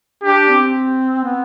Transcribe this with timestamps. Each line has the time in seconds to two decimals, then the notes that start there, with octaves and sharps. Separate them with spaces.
0.23 D4 G4
0.49 C4
1.25 B3